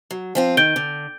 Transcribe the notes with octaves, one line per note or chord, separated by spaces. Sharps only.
F#3
F3 C4 F4
D#3 G6 D7 G7
D3